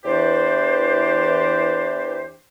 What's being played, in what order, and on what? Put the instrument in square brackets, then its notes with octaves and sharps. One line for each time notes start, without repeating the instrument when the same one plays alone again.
[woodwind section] E2 E3 D4 G4 C5